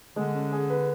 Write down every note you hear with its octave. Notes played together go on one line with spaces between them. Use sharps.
D3 G#3
C#4
G#4
B4